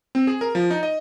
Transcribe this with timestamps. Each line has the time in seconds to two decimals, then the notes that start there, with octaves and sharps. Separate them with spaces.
0.15 C4
0.27 G#4
0.41 A#4
0.55 F3
0.71 D#4
0.83 D#5